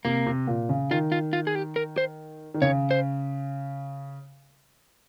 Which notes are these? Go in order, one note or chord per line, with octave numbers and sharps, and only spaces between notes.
C3 A#3
C3
A#2
C#3
D#3 F4
F4
F4
G#4
G4
A#4
C5
D#3
C#3 C#5
C5